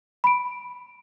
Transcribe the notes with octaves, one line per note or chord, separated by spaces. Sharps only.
B5 D7